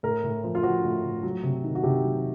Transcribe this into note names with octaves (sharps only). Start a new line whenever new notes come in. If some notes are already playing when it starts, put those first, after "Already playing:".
A2 A#4
A2
F3
F4
F3 F#4
A2
A2
F#3
C3
D#3
F#4
C3 G4
F#3